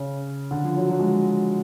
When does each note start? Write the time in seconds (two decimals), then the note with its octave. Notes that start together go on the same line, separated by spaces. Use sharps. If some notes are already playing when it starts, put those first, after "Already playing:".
Already playing: C#3
0.51 D3
0.64 F3
0.77 F#3
0.89 F#3
1.00 G#3